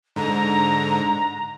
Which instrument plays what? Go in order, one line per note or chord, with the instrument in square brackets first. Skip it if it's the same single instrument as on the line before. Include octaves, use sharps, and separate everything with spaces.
[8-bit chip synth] G#2 D3 [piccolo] A#5